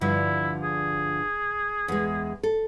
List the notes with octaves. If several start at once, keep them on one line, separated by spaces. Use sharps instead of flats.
G2 D3 F3 E4
G#4
E2 G#3
A4